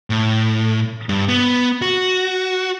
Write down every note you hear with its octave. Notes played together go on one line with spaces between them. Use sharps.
A2
G2
B3
F#4